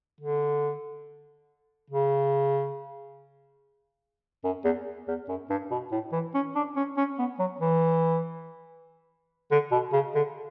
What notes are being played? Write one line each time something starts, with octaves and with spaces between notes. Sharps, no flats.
D3
C#3
F#2
E2
E2
F#2
G2
B2
A2
E3
C#4
D4
C#4
C#4
B3
F#3
E3
D3
B2
C#3
D3